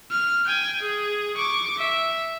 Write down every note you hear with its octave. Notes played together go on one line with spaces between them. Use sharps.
F6
G5 G#5
G#4
C#6 D6
E5